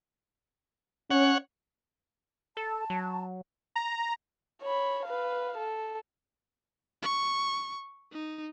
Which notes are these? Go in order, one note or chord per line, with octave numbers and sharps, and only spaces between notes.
C#4 C#5 F#5
A4 A5
F#3
A#5
C#5 B5
B4 F5
A4
C#6
D#4